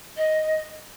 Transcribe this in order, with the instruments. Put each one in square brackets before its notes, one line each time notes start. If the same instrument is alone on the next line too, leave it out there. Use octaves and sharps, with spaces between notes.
[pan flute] D#5